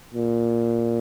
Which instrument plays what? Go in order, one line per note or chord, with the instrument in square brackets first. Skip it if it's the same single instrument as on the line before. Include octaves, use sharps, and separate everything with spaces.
[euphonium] A#2